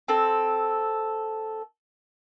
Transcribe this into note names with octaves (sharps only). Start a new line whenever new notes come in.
C4 A4